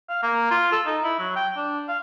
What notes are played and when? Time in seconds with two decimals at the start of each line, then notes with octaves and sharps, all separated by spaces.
0.09 F5
0.23 A#3
0.51 F4
0.72 A4
0.86 D#4
1.03 E4
1.19 F#3
1.36 G5
1.57 D4
1.88 F5